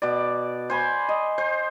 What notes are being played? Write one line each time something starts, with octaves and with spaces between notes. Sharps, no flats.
B2 D5
C5 G#5 B5
D#5
C5